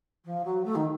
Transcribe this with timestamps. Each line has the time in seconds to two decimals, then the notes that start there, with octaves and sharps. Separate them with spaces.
0.24 F3
0.44 F#3
0.64 A3
0.75 D#3